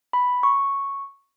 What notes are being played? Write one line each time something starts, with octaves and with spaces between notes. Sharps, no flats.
B5
C#6